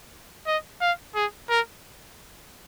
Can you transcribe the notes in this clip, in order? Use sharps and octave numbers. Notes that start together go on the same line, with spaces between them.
D#5
F5
G#4
A#4